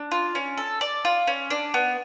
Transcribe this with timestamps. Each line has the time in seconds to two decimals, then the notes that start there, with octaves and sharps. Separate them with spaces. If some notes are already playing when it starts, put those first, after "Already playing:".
Already playing: D4
0.11 F4
0.35 C#4
0.58 A4
0.81 D5
1.05 F4
1.27 C#4
1.50 D4
1.74 B3